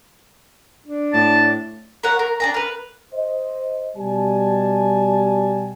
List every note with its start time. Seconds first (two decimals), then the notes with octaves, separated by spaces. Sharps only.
0.86 D4
1.13 A2 A5
2.03 A#4 C#5 F#5
2.19 A#4
2.40 D4 G#4 A#5
2.54 A#4 B4
3.14 C5 D#5
3.97 B2 G3 G#5 A5